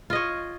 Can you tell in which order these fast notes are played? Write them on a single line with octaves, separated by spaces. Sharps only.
F4 D#5 C#5